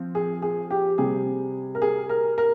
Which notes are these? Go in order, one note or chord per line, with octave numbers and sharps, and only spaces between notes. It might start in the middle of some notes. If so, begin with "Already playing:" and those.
Already playing: F3 C4
G#4
G#4
G4
C3 G3 C4 G#4
A#4
G#4
A#4
A#4